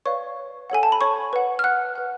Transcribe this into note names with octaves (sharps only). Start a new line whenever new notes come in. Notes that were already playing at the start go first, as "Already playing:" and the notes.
B4 C#5 D5 F5 C#6
A4 C#5 F#5 G#5
A5
B5
C#5 C#6
B4 F#5
F6
F#5 F#6
B4 F#5